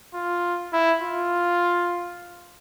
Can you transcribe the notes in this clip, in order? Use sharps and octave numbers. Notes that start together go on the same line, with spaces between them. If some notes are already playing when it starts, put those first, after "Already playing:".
F4
E4
F4